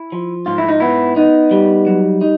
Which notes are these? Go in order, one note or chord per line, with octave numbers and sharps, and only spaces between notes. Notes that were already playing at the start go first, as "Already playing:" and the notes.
Already playing: E4
F3
G#2 F4
E4
D#4
B3 E4
B3 D#4
G3
F#3
D#4